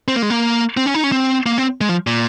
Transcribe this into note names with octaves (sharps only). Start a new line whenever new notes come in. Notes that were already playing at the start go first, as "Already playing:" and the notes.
C4
A#3
G#3
A#3
C4
C#4
D#4
C#4
C4
A#3
C4
G#3
F3
A#2